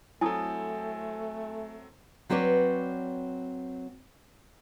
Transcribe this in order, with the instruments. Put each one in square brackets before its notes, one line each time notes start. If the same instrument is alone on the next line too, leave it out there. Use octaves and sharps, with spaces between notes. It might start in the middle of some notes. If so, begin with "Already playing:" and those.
[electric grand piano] F#3 C4 A4 [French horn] A3 [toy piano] E4 A5 D#6 [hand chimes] G#5
[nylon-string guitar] F#3 C4 B4 C#5 D5